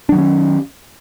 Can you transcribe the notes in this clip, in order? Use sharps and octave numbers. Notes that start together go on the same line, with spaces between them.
D#3 F#3 C#4 D4